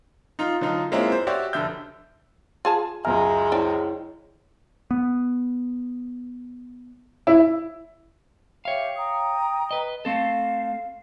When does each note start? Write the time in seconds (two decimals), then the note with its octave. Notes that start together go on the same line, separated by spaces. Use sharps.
0.39 D#4 F4
0.61 D3 F#3 D#4 F4
0.92 G#3 A#3 C4 C#4 E4 F4
1.12 C5
1.27 F#4 G4 C#5 D5 E5
1.53 F1 D3 E5 G6
2.65 F4 G#4 A5
3.05 C#2 F#2 G#3 E5 G#5 A#5 F6
3.52 C4 D4 E4 C#5
4.91 B3
7.27 E4
8.65 G4 C#5 E5 F5 G5
8.97 G5 A#5 D#6
9.71 B4 D#5
10.05 A3 C4 A4 F5